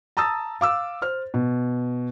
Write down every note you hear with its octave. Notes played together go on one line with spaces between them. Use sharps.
A5 A#5 D#6 E6 A6
F5 D6 E6
C5 F6
B2